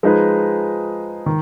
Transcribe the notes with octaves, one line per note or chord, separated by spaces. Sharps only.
F3 G#3 D#4 G#4 B4
D#3